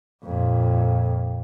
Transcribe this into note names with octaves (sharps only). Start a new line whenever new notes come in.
F2 A#2